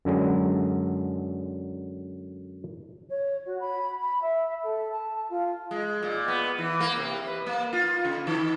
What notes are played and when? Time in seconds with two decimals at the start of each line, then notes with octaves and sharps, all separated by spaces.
0.05 F#2 D3 F#3 G#3
3.09 C#5
3.45 F#4
3.59 B5
4.01 B5
4.21 E5
4.62 A4
4.91 A5
5.29 F4
5.71 G#3
6.03 A#2
6.28 B3
6.58 E3
6.80 A#3
6.97 C3
7.27 B4
7.46 A#3
7.73 F4
8.05 C#3
8.27 D#3